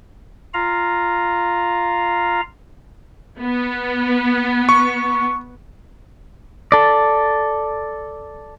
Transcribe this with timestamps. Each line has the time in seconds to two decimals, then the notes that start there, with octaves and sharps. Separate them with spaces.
0.54 F4 F5 A#5
3.41 B3
4.69 C#6
6.72 A4 D5